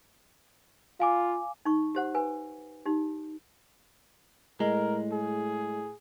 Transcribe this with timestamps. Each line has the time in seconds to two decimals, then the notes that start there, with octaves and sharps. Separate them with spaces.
1.00 F4 F5 G#5 D6
1.65 D#4 C#6
1.95 G4 C5 F#5
2.15 B4 G#5
2.86 D#4 G4
4.60 A2 G#3 A#4
5.12 G#4